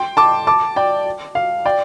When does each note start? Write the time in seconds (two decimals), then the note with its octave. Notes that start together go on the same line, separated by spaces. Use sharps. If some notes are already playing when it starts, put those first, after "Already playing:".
Already playing: G5 C6
0.17 A5 D6
0.47 A5 D6
0.76 D5 G5
1.35 F5
1.66 D5 G5